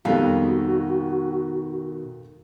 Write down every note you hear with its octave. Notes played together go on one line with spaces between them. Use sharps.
F2 B2 D#3 G3 F#4 F5